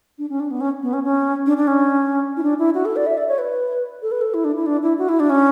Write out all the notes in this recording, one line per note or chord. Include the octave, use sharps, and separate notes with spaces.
D4
C#4
D4
B3
C#4
B3
C#4
C#4
D4
D4
C#4
E4
D4
E4
F#4
A4
D5
E5
D5
C#5
B4
A4
B4
A4
E4
D4
E4
D4
E4
F#4
E4
D4
C#4